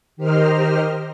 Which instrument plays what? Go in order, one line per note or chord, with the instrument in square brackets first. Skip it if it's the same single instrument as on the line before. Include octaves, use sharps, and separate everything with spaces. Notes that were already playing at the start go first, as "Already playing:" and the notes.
[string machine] D#3 G4 A#4 C5 D#5 F6